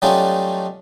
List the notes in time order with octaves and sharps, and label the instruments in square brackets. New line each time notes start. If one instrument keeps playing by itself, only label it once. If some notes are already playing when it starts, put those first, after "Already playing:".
[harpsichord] F#3 G3 A3 C#4 D#4 F4